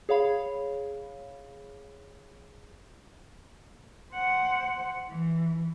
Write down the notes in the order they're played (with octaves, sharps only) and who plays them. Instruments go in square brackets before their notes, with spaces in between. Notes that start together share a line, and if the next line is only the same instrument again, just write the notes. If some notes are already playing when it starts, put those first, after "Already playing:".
[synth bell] G#4 C#5 F5 B5
[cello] C5 F#5
E3